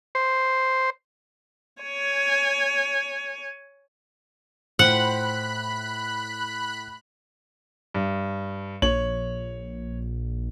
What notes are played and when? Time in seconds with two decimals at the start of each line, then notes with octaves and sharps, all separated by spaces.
0.15 C5
1.83 C#5 G#5
4.79 A2 F4 C5 F#5 G5 B5 F#6
7.94 G2
8.82 A#1 C#5 F#7